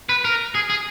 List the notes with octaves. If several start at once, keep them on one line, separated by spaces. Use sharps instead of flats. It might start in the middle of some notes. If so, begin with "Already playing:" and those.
B4
A#4
G#4
G#4